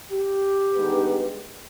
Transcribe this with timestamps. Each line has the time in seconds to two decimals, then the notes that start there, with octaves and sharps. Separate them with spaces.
0.09 G4
0.74 G2 D#3 G#3 B3